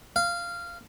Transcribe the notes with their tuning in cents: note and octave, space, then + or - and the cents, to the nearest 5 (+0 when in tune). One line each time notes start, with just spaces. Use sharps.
F5 -15